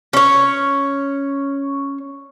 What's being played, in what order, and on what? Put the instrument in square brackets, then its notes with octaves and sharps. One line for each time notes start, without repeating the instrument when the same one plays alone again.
[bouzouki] C#4 C#5